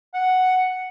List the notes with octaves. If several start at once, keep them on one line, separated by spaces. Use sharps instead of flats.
F#5